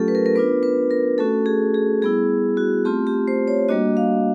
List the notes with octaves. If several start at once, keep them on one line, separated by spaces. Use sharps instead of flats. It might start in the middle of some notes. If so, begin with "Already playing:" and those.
Already playing: F#3 A3 C#4 F4 G4 A4
B4
A#4
A#4
B3 D4 F4 B4
B4
A#4
A3 C#4 F#4 A4
G#4
G#4
G3 B3 E4 G#4
F#4
A3 C4 F4 G4
G4
C5
C#5
G3 A#3 D4 F#4 D#5
F5